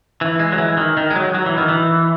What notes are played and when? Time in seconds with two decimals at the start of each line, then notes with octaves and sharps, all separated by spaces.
0.21 E3
0.39 G#3
0.52 F#3
0.58 E3
0.77 D#3
0.97 D#3
1.11 G#3
1.16 F#3
1.35 F#3
1.46 E3
1.58 D#3
1.68 E3